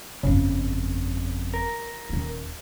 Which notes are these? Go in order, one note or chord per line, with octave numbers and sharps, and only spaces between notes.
G1 F2 C#3
A#4
D#1 A#3